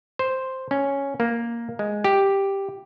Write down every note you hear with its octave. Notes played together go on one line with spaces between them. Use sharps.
C5
C#4
A#3
G#3
G4